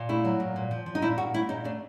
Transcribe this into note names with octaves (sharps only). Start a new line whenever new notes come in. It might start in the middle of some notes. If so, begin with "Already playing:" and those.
Already playing: A#2
A3 E4
F#3
A#2
A#2
F3
F3
D#4
A#2 E4
A#2 F#4
A3 E4
A#2 D#4
A3 D4